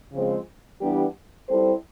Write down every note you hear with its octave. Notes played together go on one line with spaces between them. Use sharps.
C#3 F3 G#3 C4
E3 G3 B3 D4 G4
G3 C4 E4 A4 C5